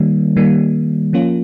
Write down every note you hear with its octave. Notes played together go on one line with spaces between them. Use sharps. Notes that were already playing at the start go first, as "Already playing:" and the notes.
Already playing: D#3 G3 A#3
D#3 G3 A#3
F3 A#3 C#4 F4